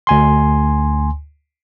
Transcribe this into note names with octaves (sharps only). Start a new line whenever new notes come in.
D2 G#5 C6